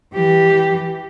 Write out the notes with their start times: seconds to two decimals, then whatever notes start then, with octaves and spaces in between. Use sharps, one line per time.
0.14 E3 G4